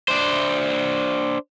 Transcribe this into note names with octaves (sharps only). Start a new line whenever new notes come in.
D4 C5